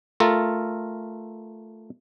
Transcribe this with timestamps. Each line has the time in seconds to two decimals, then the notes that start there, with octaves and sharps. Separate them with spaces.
0.20 A3 F4 A4 A#4